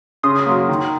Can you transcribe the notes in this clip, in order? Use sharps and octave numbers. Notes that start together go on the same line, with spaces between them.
C#3 C6 D#6
F#3 A#3
D#3